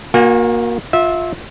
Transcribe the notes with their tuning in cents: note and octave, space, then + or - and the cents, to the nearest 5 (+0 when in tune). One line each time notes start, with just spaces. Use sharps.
A#3 +15 F#4 -30 G#5 -40
F4 +15 E5 -15